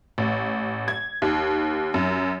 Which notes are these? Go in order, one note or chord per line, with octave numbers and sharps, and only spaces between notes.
A1
G#6
D#2
F#2